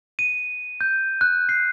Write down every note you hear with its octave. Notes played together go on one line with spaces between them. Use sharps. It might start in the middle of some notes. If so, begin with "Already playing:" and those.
D#7
G6
F#6
C7